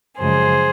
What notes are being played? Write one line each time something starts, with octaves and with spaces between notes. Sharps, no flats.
F#2 C#3 F3 G#3 G#4 C5